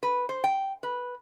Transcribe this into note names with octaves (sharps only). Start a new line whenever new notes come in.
B4
C5
G5
B4